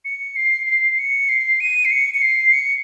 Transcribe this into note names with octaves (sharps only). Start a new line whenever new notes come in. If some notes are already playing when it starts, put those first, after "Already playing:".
C#7
C7
C7
C#7
C7
D#7
C7
C#7
C#7
C7
C#7